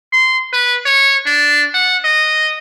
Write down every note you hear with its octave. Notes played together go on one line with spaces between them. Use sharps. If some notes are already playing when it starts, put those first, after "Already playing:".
C6
B4
C#5
D4
F#5
D#5